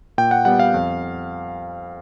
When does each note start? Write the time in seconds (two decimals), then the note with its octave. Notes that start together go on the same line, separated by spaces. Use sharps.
0.18 A#2 G5
0.31 F#5
0.45 G3 B3 F#5
0.59 F5
0.74 F2